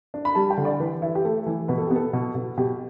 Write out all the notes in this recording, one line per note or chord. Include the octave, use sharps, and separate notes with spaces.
D4
B5
G3 A5
G5
D3
D5
E3 B4
E4
G4
A3 A4
E3
B2 B4
A4
B3 G4
A4
B2
B2
B2 G4